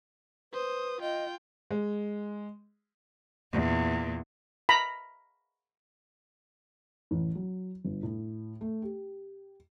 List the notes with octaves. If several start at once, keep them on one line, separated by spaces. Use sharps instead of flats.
B4 C5 D#6
F4 D#5 G5
G#3
E2 A#2
A#5 B5
A1
F#3
G1
A2
A3
G4